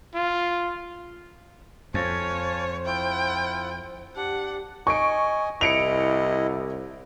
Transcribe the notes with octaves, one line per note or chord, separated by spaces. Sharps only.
F4
F2 C5 C#5 F5 G#5 A5
E4 F4 G5
D4 G4 F#5
D#5 G#5 C#6 D7
C2 E4 D#5 C#7 D7 F7